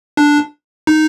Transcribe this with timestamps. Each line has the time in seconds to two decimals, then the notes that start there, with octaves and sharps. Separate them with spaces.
0.17 D4
0.87 D#4